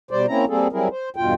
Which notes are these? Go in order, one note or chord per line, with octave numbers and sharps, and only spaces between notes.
B2 G3 C5 D5
A#3 C4 C#4 E4 A#5
G3 A#3 C4 G#4 A4
F#3 G3 C4 E4 G#4 A#4
C5
E2 G2 B2 F4 G5